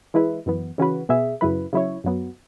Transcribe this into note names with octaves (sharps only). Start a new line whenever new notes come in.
E3 G#3 E4 B4
F#2 E3 B3
C#3 E3 C#4 F#4 B4
B2 B3 G#4 E5
F#2 C#3 F#3 E4 B4
C#3 F#3 E4 C#5
F#2 F#3 B3